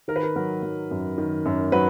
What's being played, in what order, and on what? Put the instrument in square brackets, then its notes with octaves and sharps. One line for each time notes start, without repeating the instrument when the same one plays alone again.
[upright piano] D#3 A#4
B4
A#4
F#3 A#4
F#3
F#2
D#3
F#2
F#3 B4